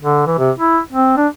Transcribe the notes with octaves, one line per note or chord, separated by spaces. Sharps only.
D3
E3
C3
E4
C4
D4